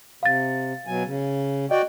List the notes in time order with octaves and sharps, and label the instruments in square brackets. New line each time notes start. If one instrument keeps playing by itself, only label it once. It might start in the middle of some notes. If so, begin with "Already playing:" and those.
[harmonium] C3 [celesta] F5 A6
[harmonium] B2 F#3 G#5
C#3
[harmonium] F#4 D5 G5 [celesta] D#5